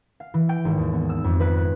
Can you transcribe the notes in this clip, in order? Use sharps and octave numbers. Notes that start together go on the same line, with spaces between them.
F5
E3
G5
G#1
D#2
B3
E6
F2
B4
F#6